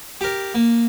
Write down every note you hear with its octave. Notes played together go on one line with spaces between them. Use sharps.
G4 A#4
A#3